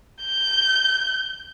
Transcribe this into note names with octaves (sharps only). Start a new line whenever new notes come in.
G6